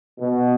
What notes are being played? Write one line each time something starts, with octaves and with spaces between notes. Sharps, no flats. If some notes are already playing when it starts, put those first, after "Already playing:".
B2